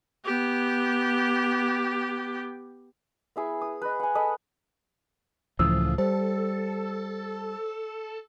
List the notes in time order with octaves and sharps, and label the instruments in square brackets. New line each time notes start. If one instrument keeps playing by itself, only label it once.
[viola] B3 G4
[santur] B3 E4 G#4
D#6
B4 D#5
F#5 G#5
A4 D#5 B5
[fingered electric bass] C#2 A2 E3 [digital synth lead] F3 [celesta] D#6 E6
[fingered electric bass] G3 [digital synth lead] A4 [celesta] C5